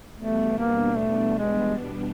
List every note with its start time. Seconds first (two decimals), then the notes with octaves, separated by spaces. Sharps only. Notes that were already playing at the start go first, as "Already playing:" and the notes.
0.17 E2 B2 G3 A3 B3 D4
0.58 A#3
0.98 A3
1.38 G#3